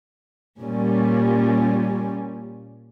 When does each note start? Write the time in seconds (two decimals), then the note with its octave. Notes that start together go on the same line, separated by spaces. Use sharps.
0.59 A#2 G3 C#4